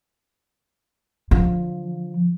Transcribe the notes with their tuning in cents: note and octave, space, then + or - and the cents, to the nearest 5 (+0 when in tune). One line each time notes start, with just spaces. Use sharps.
D3 +0 F3 +10